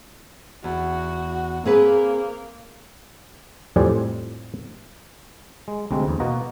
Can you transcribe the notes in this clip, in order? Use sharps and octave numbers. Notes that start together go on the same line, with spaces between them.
E2 F#4
A#3 C4 G#4 B4
F2 A2 G3 C4 D5 G#5
G#3
D2 C3 G#3 C4
E2
B2 A#3 F#4 D#5 A#5